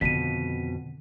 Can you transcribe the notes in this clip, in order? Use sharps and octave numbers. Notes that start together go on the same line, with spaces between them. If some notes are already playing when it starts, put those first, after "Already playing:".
F2 B2 D3 D#3 B6 D#7